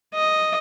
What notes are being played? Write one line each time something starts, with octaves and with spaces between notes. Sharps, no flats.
D#5